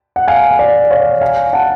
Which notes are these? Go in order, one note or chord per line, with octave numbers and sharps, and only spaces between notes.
F#5
F5 G#5
D5
C#5 F5
F5 G#5
F#5 A5